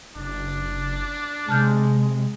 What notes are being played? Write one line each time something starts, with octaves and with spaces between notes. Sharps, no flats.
F#1 D4
C3 G#3 A5 F6 G6